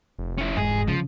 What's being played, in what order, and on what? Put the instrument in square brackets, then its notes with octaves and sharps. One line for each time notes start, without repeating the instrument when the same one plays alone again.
[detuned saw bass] F1
[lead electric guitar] C#4 E4
[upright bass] E2 G#2 [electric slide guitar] G#3 [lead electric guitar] G#4
[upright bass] C#3 [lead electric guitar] F3